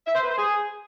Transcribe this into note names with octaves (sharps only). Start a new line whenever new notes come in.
E5
C5
B4
C5
G#4